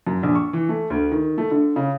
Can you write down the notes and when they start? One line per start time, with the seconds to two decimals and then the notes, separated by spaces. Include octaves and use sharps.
0.07 F#2
0.23 A#1
0.35 C#6
0.53 E3
0.69 A3
0.90 D2
1.12 D#3
1.38 A3
1.51 D3
1.76 C#3